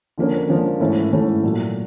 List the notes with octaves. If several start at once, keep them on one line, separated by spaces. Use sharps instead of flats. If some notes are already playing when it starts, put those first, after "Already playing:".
D3 F3 A#3 C#4
D3 F3 A#3 C#4
G#2 E3 A3 C#4 E4
G#2 E3 A3 C#4 E4
A#2 F#3 A3